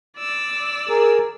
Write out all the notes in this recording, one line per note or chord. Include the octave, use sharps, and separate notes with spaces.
D5 E6
G#4 A#4